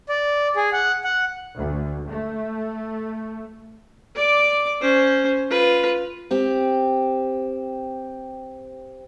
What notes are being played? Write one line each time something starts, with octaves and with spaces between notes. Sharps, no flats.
D5
G#4
F#5
F#5
D2
A3
D5 D6
C#4 C5
F4 B4
C4 G4